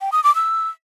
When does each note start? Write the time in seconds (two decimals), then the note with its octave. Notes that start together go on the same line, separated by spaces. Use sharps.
0.01 G5
0.12 D#6
0.24 D6
0.35 E6